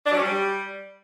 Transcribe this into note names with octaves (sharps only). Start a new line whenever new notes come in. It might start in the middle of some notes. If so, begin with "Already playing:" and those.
D4
F#3
C#4
G3